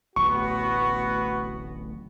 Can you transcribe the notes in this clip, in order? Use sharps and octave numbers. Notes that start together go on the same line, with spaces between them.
D1 A1 B3 F#4 C#6